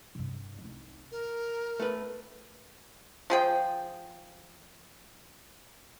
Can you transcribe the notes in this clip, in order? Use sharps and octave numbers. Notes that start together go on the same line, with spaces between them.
G2 C3
C2 D#4
A#4
A3 B4
F3 G#4 G5